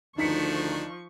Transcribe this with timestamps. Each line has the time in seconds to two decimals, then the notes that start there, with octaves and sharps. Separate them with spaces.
0.18 D2 D#3 F3 D4 D#4 C#6 B6 C#7